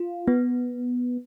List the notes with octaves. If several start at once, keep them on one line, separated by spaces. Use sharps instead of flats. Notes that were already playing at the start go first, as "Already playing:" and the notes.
Already playing: F4
B3